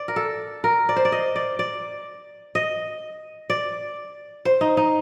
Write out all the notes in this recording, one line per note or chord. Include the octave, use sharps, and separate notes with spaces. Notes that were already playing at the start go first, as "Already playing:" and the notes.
Already playing: D5
A#4
A4
A#4
D5
C5
D5
D#5
D5
D5
D#5
D5
C5
D#4
D#4